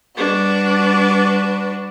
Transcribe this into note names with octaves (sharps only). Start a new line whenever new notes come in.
G3 D4 F#4 B4